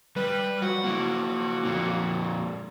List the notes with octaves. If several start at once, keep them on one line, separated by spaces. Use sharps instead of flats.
G3 B4
F3 F#3 F#4 F#5
A#3 E4
F2 A#2